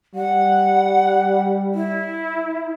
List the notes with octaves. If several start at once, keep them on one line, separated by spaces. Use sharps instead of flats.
G3 F#5
E4